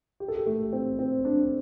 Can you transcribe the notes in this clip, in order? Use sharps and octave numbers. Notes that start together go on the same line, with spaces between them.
G4
A4
G4
A3
C4
C4
D4